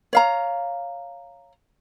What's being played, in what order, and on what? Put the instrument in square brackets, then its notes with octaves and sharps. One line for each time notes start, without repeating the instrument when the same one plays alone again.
[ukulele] C#5 F5 A#5